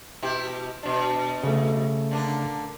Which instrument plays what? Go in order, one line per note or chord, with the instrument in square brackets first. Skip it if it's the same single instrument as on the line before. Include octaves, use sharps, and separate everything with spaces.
[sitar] B2 E4 G4
B2 D4
[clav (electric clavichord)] C#3 A3
[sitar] D3 A#3 D4